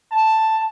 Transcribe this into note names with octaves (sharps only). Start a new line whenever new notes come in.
A5